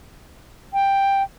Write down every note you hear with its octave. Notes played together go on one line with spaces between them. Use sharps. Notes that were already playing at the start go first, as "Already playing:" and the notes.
G5